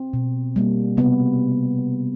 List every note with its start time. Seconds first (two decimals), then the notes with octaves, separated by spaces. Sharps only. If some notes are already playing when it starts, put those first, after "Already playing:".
Already playing: C4
0.13 B2
0.56 G3 A#3
0.97 C3 B3